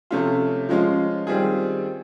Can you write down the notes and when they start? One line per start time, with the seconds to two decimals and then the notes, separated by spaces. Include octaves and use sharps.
0.11 C3 F3 A3 C#4 F4
0.69 F3 G#3 C#4 F4
1.27 D#3 G3 C4 F4 G#4